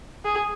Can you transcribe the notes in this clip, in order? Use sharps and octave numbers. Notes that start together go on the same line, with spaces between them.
G#4